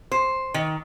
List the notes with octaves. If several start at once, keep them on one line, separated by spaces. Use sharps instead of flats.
C5
D#3